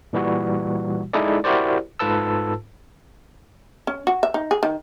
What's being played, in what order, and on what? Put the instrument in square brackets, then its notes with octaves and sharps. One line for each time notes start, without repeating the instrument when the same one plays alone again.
[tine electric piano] A#2 E3 G3 F#4
G#3 D#4 E4 G#4 A4 D5
E4 F#4 G4 A#4 C5 D5
G#2 F4 A4 B4 A5 E6
[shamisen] C#4
F#4
E5
D#4
G#4
D#3